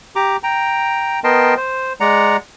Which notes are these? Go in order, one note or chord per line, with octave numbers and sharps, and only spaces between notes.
G4 A#5 D6
G5 A#5
B3 A#4 D#5 G5 A5 C6
C5
G#3 D5 F#5 A#5